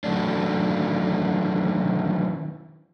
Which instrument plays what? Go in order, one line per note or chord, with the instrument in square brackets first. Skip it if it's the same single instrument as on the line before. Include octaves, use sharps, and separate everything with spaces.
[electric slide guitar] D#3 E3 F#3 A3 C#4 D4